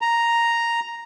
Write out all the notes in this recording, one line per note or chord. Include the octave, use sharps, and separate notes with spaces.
A#5